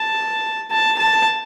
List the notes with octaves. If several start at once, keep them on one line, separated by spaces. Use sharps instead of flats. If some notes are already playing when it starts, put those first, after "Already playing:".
Already playing: A5
A5
A5